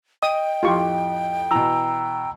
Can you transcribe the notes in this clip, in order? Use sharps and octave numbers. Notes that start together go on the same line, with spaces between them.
D#5 G5 D#6
F2 A2 F4 G4 C#6
B2 E3 A#5 E6